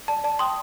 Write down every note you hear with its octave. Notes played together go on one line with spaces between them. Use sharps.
D5 A5
D5 A5
G5 C6 D#6